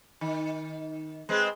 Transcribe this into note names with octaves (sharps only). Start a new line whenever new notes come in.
D#3
G#3 C4 B4